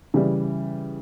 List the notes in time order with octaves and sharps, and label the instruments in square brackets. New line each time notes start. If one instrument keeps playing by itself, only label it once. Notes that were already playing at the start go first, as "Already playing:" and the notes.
[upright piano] C#3 E3 G3